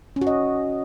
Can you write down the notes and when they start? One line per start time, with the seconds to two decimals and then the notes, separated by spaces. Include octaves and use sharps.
0.16 C#4
0.21 F#4
0.27 D#5